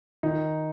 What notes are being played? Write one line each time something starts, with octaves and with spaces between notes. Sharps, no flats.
D#3 D#4